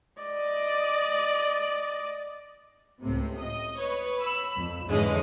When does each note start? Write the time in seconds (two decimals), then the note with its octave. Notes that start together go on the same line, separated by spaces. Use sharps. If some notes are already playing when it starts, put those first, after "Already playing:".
0.22 D5 D#5
3.02 C#2 A2 C3
3.39 D#5
3.78 B4 C#5
4.20 B5 E6
4.57 F2
4.88 F2 G#2 D3 E3 G#3 C#4